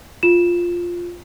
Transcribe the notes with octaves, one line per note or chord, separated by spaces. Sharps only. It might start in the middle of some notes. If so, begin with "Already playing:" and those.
F4 E7